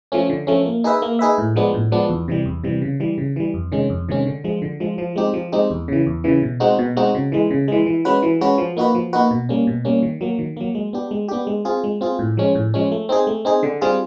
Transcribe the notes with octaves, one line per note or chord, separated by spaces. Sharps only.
F3 A3 C#4
D3
F3 A3 C#4
A#3
D#4 G#4 B4 E5
A#3
D#4 G#4 B4 E5
A2
F3 G#3 B3 D4
A2
F3 G#3 B3 D4
E2
C3 E3 G3
E2
C3 E3 G3
C#3
E3 G3
C#3
E3 G3
F2
C3 D#3 G#3 C#4
F2
C3 D#3 G#3 C#4
D3
F3 G#3
D3
F3 G#3
F3
G#3 C4 D#4 G4
F3
G#3 C4 D#4 G4
E2
C#3 E3
E2
C#3 E3
B2
G#3 C4 D#4 F#4
B2
G#3 C4 D#4 F#4
C#3
E3 G#3
C#3
E3 G#3
E3
G#3 C#4 F#4 B4
E3
G#3 C#4 F#4 B4
F3
A#3 D#4 F#4 B4
F3
A#3 D#4 F#4 B4
B2
G3 A#3 C#4
B2
G3 A#3 C#4
D#3
F#3 A#3
D#3
F#3 A#3
G#3
B3 D4 G4
G#3
B3 D4 G4
G#3
C4 F4 G#4
G#3
C4 F4 G#4
A2
F3 G#3 C#4
A2
F3 G#3 C#4
A3
C4 D#4 G#4
A3
C4 D#4 G#4
D3
G3 C4 F4 G#4